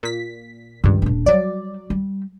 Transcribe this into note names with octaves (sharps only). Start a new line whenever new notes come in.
A#2 B6
C#2 G2 D#3 G3
D#1 D4
F#3 G3 D5
G3